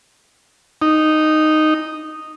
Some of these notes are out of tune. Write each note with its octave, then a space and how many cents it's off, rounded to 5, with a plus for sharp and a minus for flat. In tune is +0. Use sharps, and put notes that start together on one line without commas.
D#4 -5